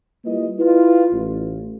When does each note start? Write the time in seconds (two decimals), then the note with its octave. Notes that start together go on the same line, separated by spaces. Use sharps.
0.25 G3 A#3 E4 F4 B4 D#5
0.59 E4 F4 B4
1.11 A1